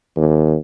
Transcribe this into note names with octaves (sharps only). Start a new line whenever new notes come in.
D#2